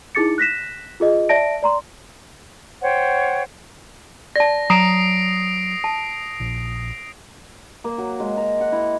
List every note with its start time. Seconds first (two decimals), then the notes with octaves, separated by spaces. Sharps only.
0.15 D#4 E4 G#4 D6 A6 C#7
0.38 F#6 A#6 B6 E7
1.00 F4 G#4 D#5
1.29 D5 E5 A5 A#6 D7
1.62 D5 A#5 C6
2.82 C5 C#5 F#5 G5
4.36 D5 A5 A#6
4.70 F#3 A#5 D#6 C7 D7
5.84 A5
6.40 A#1
7.84 A#3
7.98 F#3
8.20 G#3
8.37 A#5
8.60 F#5
8.72 E4